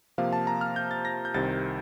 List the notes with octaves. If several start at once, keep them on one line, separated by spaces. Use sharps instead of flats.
C3 F3 A#3 F5
A5
A#5
F6
G6
A6
A#6
G6
C2 C3 D#3 A6